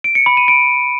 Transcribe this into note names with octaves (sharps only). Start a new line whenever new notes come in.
D7
C#7
B5
D#7
D7